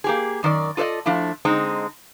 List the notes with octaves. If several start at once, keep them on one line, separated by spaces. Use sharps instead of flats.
A#3 G4 G#4
F#2 D#3 A#4 D5
F4 A4 B4 D5 D#5
F3 A3 D4 E4
D3 G#3 C4 D#4